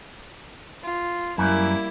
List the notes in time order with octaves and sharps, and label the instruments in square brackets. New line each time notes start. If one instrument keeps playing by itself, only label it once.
[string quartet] F4
[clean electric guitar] F#2 [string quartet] G3 A#3 E4